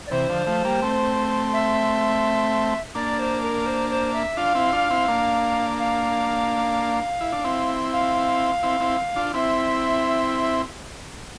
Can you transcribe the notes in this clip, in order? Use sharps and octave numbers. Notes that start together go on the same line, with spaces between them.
D5
C3 E3 C5
D3 F3
F3 A3
G3 A#3
A3 C4
E5
A#3 D4 D5
C5
A#4
C5
C5
E5
D4 F4 F5
C4 E4
D4 F4
C4 E4
A#3 D4
F5
E4
D4
C4 E4
F5
C4 E4
C4 E4
D4 F4
C4 E4 E5